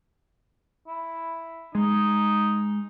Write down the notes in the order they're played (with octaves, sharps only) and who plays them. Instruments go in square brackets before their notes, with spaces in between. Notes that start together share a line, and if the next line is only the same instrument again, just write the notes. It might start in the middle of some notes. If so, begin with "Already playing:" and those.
[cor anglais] E4
[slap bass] G#3 [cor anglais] D#4